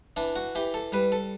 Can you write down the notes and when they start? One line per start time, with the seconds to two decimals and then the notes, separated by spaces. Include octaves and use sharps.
0.16 E3 D4
0.36 F#4
0.55 E3 G4
0.74 A4
0.92 G3 B4
1.12 A4